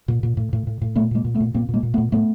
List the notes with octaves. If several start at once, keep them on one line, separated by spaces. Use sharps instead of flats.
A#2
A#2
A2
A2
A2
A2
A#2 A3 B3
A#2 G#3 A#3
A#2
A3 B3
A#2
A#2 A#3 C4
A#2 G#3 A#3
A#2
A3 B3
A#2
A2 A3 B3